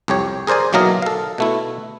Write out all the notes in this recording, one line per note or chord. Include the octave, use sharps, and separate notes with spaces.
C2 F2 G4 C#5
G#4 A#4 C5 D5 G#5
B1 E3 F#3 A#3 A#4 D#5
A4 F5
B2 A3 E4